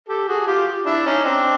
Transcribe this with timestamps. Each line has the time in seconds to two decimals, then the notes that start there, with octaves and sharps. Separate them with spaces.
0.09 G4 A4
0.28 F#4 G#4
0.47 F4 G4
0.86 D4 E4
1.06 C#4 D#4
1.25 C4 D4